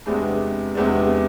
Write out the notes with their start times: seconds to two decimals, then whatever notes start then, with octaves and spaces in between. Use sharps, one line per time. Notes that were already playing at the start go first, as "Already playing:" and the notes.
0.06 E2 C3 G#3 B3 D4
0.75 E2 C3 G#3 B3 D4